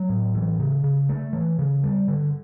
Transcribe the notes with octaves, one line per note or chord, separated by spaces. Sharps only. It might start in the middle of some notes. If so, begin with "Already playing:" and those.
Already playing: F#3
A2
E3
C#3
C#3
A3
E3
C#3
G3
D3